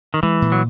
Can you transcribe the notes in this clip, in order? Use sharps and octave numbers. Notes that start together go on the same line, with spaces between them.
D#3
E3 G#3
A#2
F#3